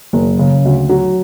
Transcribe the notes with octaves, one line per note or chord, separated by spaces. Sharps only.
F#1
C#3
D2
F#3